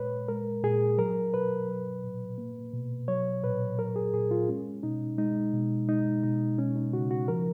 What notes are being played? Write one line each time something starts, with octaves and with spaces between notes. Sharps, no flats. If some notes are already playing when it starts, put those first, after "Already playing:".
Already playing: A#2 G#3 B4 C#5
G#3 A#4
A#2 G#4
F#3 A#4
B2 B4
F#3
A#2
A#3
B2
F#3 C#5
A#2 B4
F#3 A#4
G#4
A#2 G#4
F4
G#3 C#4
B2 D#4
G#3 D#4
B2
G#3 D#4
B2 D#4
G#3 C#4
D#4
C#3 F#4
F#4
F3 A#4